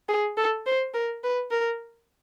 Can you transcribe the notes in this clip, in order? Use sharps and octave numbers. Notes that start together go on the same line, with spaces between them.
G#4
A4
C5
A#4
B4
A#4